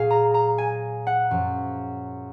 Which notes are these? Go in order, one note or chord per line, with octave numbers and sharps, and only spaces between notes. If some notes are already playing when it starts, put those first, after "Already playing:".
Already playing: A#2 F#3 G#4 F5
A#5
A#5
G#5
F#5
F#2 F3